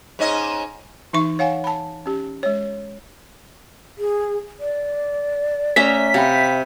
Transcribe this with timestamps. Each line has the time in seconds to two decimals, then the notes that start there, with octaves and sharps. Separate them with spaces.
0.19 G#2 C#4 D#5
1.13 E3 D#4 E5 C#6
1.39 C#5 F5 F#5 G#5
1.64 A5 B5
2.06 C#4 G4
2.43 G#3 C#5
3.98 G#4
4.60 D5
5.76 A3 C#4 C#5 E5 A#5 B6
6.14 C3 F5 G5 B5